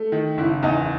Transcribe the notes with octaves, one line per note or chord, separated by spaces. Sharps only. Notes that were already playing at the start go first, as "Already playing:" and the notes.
Already playing: A3
D#3
F#1 E4
E2 D#4